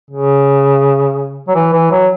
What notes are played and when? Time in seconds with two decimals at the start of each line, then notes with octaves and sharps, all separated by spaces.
0.11 C#3
1.47 F#3
1.55 E3
1.73 E3
1.91 F#3